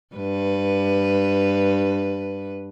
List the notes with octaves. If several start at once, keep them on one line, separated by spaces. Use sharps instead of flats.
G2 B4